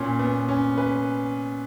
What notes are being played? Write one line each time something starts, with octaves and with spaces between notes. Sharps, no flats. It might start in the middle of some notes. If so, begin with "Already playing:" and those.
Already playing: A#2 C#4
B3
C#4
B4